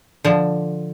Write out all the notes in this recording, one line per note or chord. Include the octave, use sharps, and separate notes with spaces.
D3 F3